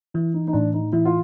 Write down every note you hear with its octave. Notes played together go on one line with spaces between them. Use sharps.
E3 E4
D#4
D#4
A2 D4
D#4
E3 E4
F4